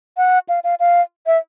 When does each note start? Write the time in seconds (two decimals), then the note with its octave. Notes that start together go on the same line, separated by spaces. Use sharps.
0.17 F#5
0.49 F5
0.64 F5
0.80 F5
1.27 E5